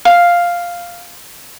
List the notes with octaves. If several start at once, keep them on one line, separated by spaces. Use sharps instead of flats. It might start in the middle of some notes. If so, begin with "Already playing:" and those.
F5